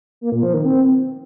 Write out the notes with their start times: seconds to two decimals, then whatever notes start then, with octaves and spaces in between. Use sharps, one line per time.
0.21 A#3
0.32 A#2
0.43 F3
0.54 D#3
0.65 C4